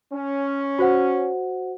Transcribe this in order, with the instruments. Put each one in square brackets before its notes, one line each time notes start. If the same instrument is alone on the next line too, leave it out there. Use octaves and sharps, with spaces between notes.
[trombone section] C#4
[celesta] F#4 C5 F#5